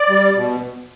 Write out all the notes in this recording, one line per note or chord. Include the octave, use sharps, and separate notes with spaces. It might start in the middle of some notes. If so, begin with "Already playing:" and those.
Already playing: D5
G3
B2